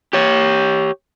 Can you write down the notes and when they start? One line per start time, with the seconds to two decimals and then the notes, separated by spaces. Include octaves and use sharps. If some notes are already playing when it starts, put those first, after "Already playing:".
0.13 G4 C#5